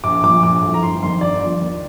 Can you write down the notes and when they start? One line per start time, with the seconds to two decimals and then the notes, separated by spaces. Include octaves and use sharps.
0.04 A#1 D6
0.23 A#2 D6
0.29 F3
0.43 A#1 D6
0.62 A2 F3
0.74 A#5
0.83 G1 C6
1.03 F2 D#3 C6
1.21 G1 D5
1.41 G2 F3 D5
1.61 D#2